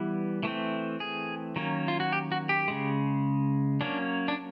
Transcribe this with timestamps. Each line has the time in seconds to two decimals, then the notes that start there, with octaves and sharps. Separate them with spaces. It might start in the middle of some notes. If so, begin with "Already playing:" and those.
Already playing: E3 G3 B3
0.43 E3 A3 C4
1.00 G#4
1.56 D#3 F#3 A#3 C#4
1.88 F4
2.00 F#4
2.12 G4
2.32 F#4
2.49 G4
2.68 C#3 F3 G#3
3.81 F#3 A#3 C#4 D4
4.28 D4